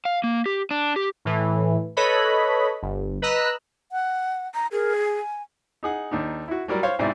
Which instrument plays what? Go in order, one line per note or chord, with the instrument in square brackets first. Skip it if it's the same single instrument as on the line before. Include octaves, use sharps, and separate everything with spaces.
[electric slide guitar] F5
A#3
G4
D4
G4
[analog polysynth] A2 E3
A4 B4 C#5 D#5 B5
G1
B4 D#5 A#5 E6 F#6
[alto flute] F#5
[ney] A#5
[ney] G#4 [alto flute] A#4
[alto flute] G#5
[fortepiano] D#4 G#4 F#5
D#2 D4 D#4
E4 F#4
F#3 G3 A#4 D5
C5 C#5 F5
B1 G#2 C3 E4 D5